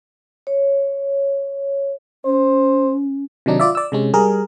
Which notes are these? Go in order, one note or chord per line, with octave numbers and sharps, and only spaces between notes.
C#5
C#4 C5
C3 D#3 F#3 D4 D#4
F4 D5 E5
D5 E6
C3 G#3 C#4
G3 G#4 A#4